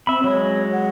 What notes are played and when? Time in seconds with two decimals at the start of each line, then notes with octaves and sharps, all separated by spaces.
0.07 C4 E5 B5
0.24 F#3 G#3 C#5
0.72 F#5